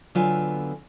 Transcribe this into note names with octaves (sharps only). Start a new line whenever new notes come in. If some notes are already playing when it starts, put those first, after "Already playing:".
D3 F#3 B3 F4 B4 G#5